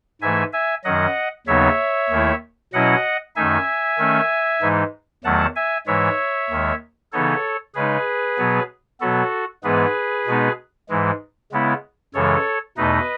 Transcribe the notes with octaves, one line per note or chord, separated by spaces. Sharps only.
G#2 E3 A3 E5 G#5
E5 G#5
F#2 D#3 F#3 D#5 F#5
D#2 C#3 F#3 B3 D#4 C#5 E5
D#2 D#3 A3 E4
B2 F#3 C#4 E4 D#5 F#5
F#2 D#3 A3 D#4 E5 G#5
D#3 A3 C#4
G#2 E3 G#3 D#4
E2 D#3 F#3 A3 F#5 A5
E5 G#5
G#2 E3 G#3 C#5 E5
D#2 D#3 G#3
C#3 E3 B3 D#4 A4 C#5
C#3 G#3 D#4 G#4 B4
B2 F#3 B3
B2 F#3 B3 F#4 A4
G#2 E3 G#3 B3 G#4 B4
B2 G#3 B3 D#4
G#2 E3 G#3
C#3 G#3 B3 E4
F#2 C#3 E3 G#3 A4 C#5
E2 B2 A3 D#4 B4 D#5